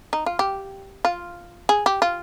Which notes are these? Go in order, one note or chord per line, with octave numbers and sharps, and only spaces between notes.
D#4
F4
G4
F4
G#4
G4
F4